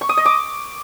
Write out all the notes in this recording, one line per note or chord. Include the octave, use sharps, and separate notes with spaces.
C#6
D#6
D#5
D6